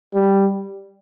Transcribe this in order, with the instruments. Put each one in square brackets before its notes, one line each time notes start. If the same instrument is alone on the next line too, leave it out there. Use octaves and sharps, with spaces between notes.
[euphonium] G3